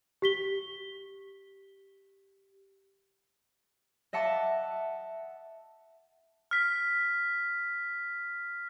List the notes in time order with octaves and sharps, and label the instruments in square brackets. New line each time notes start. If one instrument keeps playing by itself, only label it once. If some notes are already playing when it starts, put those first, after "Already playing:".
[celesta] G4 B6 G7
[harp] D#5 E5 F#5 A5 D6
[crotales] F6 B6